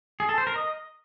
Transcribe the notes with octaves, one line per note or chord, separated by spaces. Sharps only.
G#4
A4
C5
A#4
D#5